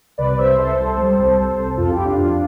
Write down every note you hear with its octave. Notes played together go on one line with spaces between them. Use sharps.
C2 B4 D5
D5
C2 C5 E5
C2 A4 C5
C2
G3
C2
C2
C2
F2 F4 A4
E4 G4
F2
D4 F4
F2 D4 F4